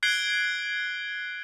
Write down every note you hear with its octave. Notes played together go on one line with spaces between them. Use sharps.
F#6 G#6 C7 D7 F#7 G7